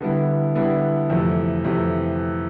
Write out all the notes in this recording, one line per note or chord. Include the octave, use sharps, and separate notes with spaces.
D3 G3 B3 E4
D3 G3 B3 E4
F2 C3 E3 A3
F2 C3 E3 A3